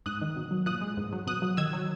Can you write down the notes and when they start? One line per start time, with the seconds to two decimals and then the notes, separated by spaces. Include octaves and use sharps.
0.06 G#2 D#6 F#6
0.22 D#3
0.36 B2
0.51 F#3
0.66 A#2 D#6 F#6
0.81 G#3
0.97 G#2
1.13 F#3
1.27 B2 D#6 F#6
1.42 F#3
1.57 D#3 E6 G#6
1.73 F#3